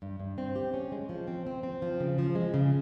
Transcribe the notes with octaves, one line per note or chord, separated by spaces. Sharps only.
G2
G2
C4
G4
C#4
G#3
F3
C4
C4
C4
F3
C#3
F3
G#3
C#3